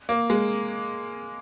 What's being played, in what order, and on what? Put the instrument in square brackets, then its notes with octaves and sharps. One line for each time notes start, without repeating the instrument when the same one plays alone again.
[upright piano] A#3
G#3